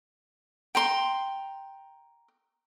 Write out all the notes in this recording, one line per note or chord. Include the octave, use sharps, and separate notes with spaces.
G5 A#5 C6